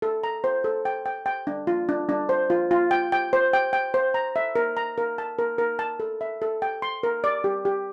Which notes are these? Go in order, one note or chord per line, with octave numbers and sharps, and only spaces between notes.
A4
A#5
C5
A4
G5
G5
G5
D4
F4
D4
D4
C5
F4
F4
G5
G5
C5
G5
G5
C5
A#5
E5
A#4
A#5
A#4
A5
A#4
A#4
A5
A4
E5
A4
G5
C6
A#4
D5
G4
G4